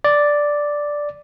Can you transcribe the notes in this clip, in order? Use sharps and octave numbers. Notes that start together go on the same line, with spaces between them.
D5